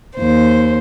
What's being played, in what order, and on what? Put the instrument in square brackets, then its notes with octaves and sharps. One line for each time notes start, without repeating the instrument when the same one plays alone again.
[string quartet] D#2 C5